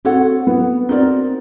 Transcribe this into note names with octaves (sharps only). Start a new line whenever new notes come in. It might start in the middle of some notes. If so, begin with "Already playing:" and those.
C4 F#4 A4 C#5 F#5
B3
C4 D#4 F#4 A#4 D5